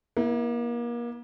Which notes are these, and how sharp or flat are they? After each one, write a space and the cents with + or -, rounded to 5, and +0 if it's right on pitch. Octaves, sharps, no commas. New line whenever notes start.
A#3 +35 E4 -10